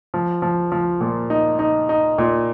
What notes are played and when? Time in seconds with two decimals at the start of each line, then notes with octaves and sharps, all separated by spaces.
0.14 F3
0.42 F3
0.72 F3
1.01 A#2
1.30 D#4
1.59 D#4
1.89 D#4
2.18 A#2